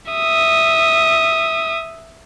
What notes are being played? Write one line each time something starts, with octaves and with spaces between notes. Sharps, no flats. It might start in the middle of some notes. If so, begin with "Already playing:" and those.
E5 D#6